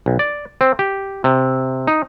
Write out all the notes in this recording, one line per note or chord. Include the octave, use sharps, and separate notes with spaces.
B1
D5
C4
G4
C3
D#4